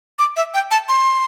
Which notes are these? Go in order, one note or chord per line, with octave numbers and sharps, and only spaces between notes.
D6
E5
G5
A5
C6